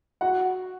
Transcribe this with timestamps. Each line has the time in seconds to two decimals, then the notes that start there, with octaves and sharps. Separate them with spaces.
0.21 F#4 F#5